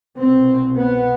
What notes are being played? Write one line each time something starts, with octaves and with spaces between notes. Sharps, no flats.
C2 B2 C4
B3